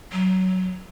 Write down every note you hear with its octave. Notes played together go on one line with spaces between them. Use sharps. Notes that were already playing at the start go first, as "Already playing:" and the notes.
F#3